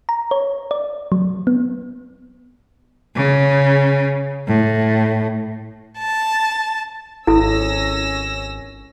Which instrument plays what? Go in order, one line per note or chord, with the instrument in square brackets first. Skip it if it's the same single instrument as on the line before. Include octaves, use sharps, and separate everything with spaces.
[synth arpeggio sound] A#5
C#5
D5
F#3
B3
[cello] C#3
A2
[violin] A5
[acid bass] G#1 [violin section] C#4 E6 A#6 [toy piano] E4 A4